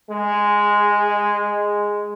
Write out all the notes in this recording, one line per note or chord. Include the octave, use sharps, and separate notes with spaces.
G#3